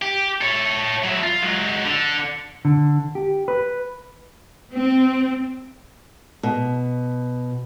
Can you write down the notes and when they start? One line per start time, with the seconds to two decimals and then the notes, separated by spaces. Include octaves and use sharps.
0.02 G4
0.41 A4 C#5
1.04 F#3 E4
1.24 F4
1.42 F#3 G#3
1.85 D3
2.65 D3
3.15 G4
3.48 B4
4.72 C4
6.43 B2